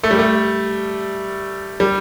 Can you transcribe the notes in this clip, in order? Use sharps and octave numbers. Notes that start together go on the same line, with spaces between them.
A3
G3
A3
G3